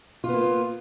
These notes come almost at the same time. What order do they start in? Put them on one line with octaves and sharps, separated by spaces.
F4 B3 A#3